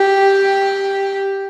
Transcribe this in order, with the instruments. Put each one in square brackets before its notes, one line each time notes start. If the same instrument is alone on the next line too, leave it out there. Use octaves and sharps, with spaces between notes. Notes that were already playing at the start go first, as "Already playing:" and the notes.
Already playing: [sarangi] G4